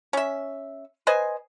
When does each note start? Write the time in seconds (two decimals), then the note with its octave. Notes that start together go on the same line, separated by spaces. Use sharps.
0.13 C#4 E5
1.07 B4 C5 D#5 G#5